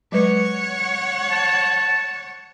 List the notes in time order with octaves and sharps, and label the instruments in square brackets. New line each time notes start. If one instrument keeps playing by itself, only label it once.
[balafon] F#3 G#3 B4 [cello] C#5 F#5
[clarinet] A5